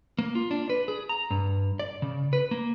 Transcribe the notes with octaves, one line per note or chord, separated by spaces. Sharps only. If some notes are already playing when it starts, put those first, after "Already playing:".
A#3
F4
D4
B4
G#4
A#5
G2
D5
C#3
B4
A#3